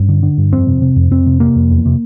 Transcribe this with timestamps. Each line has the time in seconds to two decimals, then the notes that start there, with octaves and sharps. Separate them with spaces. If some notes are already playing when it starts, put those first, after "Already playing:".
Already playing: G2 C#4
0.09 D3
0.23 D3
0.38 G2
0.52 F2 C4
0.67 C3
0.82 C3
0.96 F2
1.11 F2 C4
1.26 C3
1.40 C3 A#3
1.56 F2
1.71 E2
1.86 C3